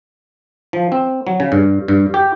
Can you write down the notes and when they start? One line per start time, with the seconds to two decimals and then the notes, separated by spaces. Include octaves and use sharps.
0.73 F3
0.92 C4
1.27 F#3
1.40 C#3
1.52 G2
1.88 G2
2.14 G4